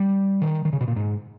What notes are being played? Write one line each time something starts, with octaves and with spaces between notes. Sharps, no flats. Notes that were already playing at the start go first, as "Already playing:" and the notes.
Already playing: G3
D#3
D#3
C#3
B2
A#2
G#2